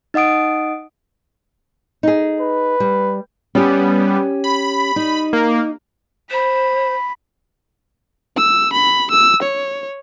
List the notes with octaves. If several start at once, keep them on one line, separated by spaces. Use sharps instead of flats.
D#4 D#5 F#5 D#6 D7
D#4 G#4
B4
G3
G3 B3 C#4 G4
B5
D#4
A#3
C5 B5
E6
B5
E6
C#5